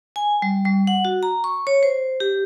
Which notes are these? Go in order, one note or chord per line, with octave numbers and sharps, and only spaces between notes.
G#5
G3
G3
F#5
F#4
A#5
C#6
C#5
C5
G4